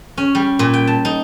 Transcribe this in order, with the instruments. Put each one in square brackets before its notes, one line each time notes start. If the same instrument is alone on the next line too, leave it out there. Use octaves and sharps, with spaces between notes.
[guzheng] C#4
G3
A#2
G5
A5
D#4